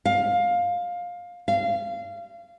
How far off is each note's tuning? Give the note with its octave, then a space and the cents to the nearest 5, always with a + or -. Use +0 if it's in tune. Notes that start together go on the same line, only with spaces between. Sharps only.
F5 +15
F5 -25